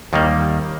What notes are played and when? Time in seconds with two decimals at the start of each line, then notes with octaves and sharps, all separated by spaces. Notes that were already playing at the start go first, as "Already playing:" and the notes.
0.13 D#2 D#3 G3 A#3